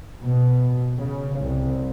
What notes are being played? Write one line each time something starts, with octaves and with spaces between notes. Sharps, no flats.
B2
C#3
C2